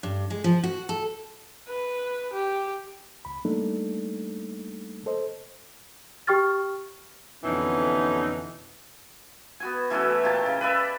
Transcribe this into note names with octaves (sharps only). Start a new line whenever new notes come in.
G2
G#3
F3
F#4
A4
B4
G4
C#2 B5
G3 A3 A#3 D4 D#4 A4
A4 C5 D#5
G4 G5 C#6 F6 A6
F2 B2 D3 E3 C#4 D#4
B3 F#4 G#5
E3 A3 C#4 F#4
A#2 G4 A5
C#3
B4 D5 E5